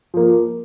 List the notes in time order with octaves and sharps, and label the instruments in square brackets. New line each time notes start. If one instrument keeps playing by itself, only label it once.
[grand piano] F3 A#3